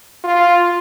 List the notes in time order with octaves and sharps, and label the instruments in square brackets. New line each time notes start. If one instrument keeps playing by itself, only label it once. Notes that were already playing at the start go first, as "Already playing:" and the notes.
[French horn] F4